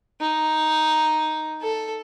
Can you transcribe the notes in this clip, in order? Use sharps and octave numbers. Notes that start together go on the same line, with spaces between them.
D#4
A4